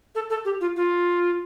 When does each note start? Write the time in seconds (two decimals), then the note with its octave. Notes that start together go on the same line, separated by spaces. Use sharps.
0.15 A4
0.30 A4
0.45 G4
0.61 F4
0.76 F4